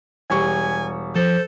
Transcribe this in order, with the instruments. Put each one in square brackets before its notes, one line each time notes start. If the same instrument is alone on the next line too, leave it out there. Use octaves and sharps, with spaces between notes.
[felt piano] E1 G3 C#6 [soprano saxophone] G#5
[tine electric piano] F3 [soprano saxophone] A4 [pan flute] C5